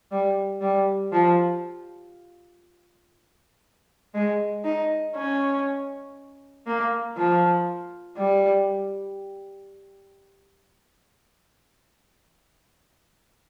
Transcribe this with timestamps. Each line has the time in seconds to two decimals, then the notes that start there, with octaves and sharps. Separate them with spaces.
0.11 G3
0.61 G3
1.12 F3
4.14 G#3
4.65 D#4
5.15 C#4
6.67 A#3
7.17 F3
8.18 G3